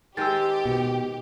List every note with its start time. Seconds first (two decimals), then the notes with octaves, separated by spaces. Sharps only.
0.17 D#3 G#3 G4 C5 E6 A6
0.65 B2